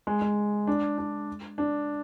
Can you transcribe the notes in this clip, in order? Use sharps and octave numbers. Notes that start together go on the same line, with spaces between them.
G#3
G#3
D4
D4
D4